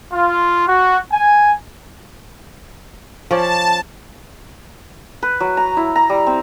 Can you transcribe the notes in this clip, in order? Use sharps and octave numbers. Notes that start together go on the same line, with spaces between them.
F4
F#4
G#5
F3 C#4 D5 A5
B4
F#3
A#5
E4
A#5
G3
C4